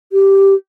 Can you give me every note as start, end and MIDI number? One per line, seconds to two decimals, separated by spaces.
0.13 0.54 67